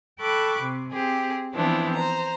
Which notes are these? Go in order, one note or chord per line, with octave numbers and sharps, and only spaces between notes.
A4 G5 B5 C#6 D6 F#6
C3
C4 G4 G#4
E3 F3 B3 C4 D4 E4
C5 A#5